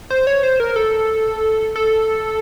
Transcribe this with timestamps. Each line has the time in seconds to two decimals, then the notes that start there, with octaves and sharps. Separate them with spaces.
0.10 C5
0.27 C#5
0.43 C5
0.60 A#4
0.76 A4
1.76 A4